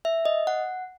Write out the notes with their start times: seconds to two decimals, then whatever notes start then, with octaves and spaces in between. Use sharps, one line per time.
0.05 E5
0.25 D#5
0.47 F#5